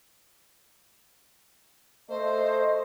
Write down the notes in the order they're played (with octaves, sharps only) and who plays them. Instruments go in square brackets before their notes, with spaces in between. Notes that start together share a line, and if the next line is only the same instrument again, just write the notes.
[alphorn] A3 [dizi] C5 [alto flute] D#5